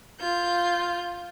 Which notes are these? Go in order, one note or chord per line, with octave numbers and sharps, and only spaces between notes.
F4 G6